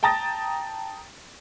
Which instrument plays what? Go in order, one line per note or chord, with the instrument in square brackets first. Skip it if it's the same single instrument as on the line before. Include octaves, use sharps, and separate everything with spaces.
[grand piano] G5 A5 A#5 D#6 A6 A#6